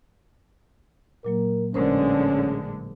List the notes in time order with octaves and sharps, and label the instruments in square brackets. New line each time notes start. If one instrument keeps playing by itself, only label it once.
[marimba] A#2 F#3 A#3 [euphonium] A#4
[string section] A1 D3 G#3 [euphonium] C#4 [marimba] A#4 C5